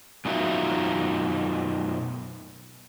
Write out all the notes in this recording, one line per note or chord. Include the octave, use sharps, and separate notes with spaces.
F#2 B2 D#4 F4 F#4 E5